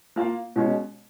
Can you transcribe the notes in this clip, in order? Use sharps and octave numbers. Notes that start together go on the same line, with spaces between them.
A#3 F4 A#4 F5
B2 G#3 C#4